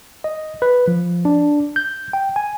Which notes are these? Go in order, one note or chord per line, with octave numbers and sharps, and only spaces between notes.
D#5
B4
F3
D4
G6
G5
G#5